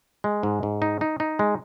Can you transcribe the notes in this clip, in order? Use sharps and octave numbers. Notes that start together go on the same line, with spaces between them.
G#3
G#2
G#2
D#4
D#4
D#4
G#3